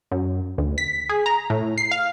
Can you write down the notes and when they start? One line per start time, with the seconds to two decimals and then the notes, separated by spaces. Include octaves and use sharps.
0.11 F#2
0.58 D2
0.78 B6
1.09 G#4
1.26 A#5
1.50 A2
1.78 C7
1.91 F5